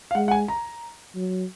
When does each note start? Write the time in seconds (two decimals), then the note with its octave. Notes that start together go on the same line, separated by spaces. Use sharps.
0.11 F5
0.15 G#3 F#5
0.28 F#5
0.31 G#5
0.48 A#5
1.15 F#3